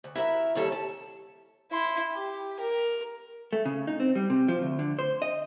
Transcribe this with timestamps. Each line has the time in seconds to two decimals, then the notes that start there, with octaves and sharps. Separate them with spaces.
0.04 D2
0.15 E4 F#4 A#4 E5
0.55 D#2 D3 G3 A4 C#5 A5
0.72 A5
1.72 E4 C6
2.13 G4
2.60 A#4
3.53 A3
3.65 C#3
3.87 D#4
4.00 C4
4.15 G3
4.30 C3
4.48 F3
4.62 D2
4.79 D3
4.99 C5
5.22 D#5